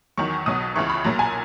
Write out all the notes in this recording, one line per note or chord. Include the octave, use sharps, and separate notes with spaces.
E2 D#3 F#3 C#6
B1 B2 F#3 D#6
C#2 C#3 E3 C#6
B5
B1 A#2 F#3 A#5
G#5